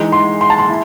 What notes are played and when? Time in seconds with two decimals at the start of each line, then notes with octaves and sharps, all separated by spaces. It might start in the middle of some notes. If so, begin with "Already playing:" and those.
Already playing: E3 G#3 D#4
0.12 C6
0.41 C6
0.50 A5
0.58 C6
0.69 E4